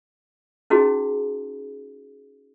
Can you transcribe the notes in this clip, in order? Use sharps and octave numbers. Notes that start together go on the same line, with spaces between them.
C#4 D#4 E4 F#4 G#4